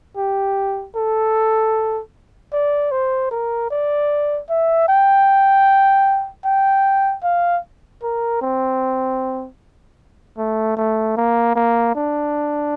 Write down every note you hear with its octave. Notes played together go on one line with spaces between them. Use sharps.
G4
A4
D5
C5
A#4
D5
E5
G5
G5
F5
A#4
C4
A3
A3
A#3
A#3
D4